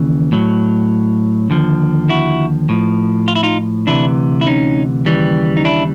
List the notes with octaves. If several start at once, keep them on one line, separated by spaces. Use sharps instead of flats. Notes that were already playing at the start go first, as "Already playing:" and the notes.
Already playing: D#2 C#3 E3
A2 F#3
D#2 D3 F3
E4 F#4
A2 F3
F4
E4
D#4 F4
D2 C3 E3 D4 E4
E4
C#4 D#4
D#2 C#3 E3 G3
D#4
D4 E4